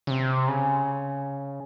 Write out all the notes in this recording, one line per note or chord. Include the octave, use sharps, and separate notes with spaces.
C#3
C3
C#3